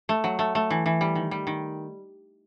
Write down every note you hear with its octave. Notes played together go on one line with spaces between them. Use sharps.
A3
F#3
A3
A3
E3
E3
G3
D#3
G3
D#3